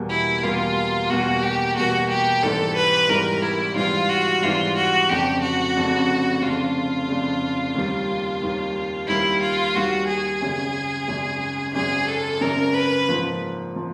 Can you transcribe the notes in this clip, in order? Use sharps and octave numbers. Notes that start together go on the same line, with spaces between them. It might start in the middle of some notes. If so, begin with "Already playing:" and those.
Already playing: E2 B2 G3 A#3
E4
E2 B2 G3 A#3 F4
E2 B2 G3 A#3 F#4
G4
E2 B2 G3 A#3 F#4
G4
G#1 G#2 E3 G3 A4
B4
G#1 G#2 E3 G3 A#4
E4
G#1 G#2 E3 G3 F4
F#4
G#1 G#2 E3 G3 F4
F#4
F1 F2 C#3 G4
F#4
F1 F2 C#3
F1 F2 C#3 F4
F1 F2 C#3
D#2 D#3 G3
D#2 D#3 G3
D#2 D#3 G3 E4
F4
D#2 D#3 G3 F#4
G#4
G#1 F#2 C#3
G#1 F#2 C#3
G#1 F#2 C#3 G#4
A4
G#1 F#2 C#3 A#4
B4
G#2 F3 A#3
F3